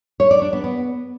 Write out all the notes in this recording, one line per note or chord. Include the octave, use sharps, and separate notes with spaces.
C#5
D5
D4
B3
B3